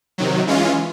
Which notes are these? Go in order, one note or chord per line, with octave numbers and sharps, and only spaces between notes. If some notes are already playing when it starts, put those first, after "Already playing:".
C3 D#3 F#3
E3 G#3 C#4 F4